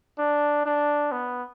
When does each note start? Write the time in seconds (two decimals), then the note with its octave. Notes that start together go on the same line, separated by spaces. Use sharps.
0.19 D4
0.65 D4
1.12 B3